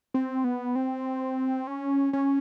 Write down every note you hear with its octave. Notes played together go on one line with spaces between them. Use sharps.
C4
B3
C4
C#4
C#4